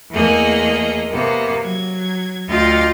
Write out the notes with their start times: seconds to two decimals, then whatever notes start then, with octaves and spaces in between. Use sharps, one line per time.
0.12 E2 A3 A#3 G#4 D#5
1.12 C3 A#3 B3
1.63 F#3 G#6
2.49 D2 F4 D#5 F5 G5 A6